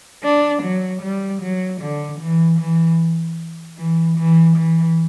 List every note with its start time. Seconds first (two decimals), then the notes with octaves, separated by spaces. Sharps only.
0.24 D4
0.63 F#3
1.03 G3
1.42 F#3
1.82 D3
2.20 E3
2.60 E3
3.78 E3
4.18 E3
4.57 E3